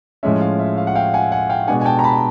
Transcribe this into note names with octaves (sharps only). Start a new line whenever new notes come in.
A2 F3 G#3 C#4 E5
F5
E5
F5
F#5
F5 G5
F#5 G#5
F#5 G#5
F5 G5
B2 G#3 B3 D4 F#5 G#5
G#5
G5 A5
A#5
A5 B5